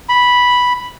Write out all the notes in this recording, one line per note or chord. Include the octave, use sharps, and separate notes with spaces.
B5